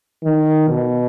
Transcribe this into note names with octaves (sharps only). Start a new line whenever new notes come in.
D#3
B2